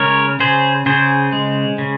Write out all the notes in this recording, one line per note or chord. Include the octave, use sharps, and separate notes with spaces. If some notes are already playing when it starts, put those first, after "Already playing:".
Already playing: C#3 G#3 A#4 C#5
C#3 G#4 C5
C#3 G#4 C5
G#3
C#3